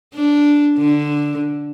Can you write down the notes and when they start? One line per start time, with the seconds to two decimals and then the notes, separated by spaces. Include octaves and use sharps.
0.15 D4
0.77 D3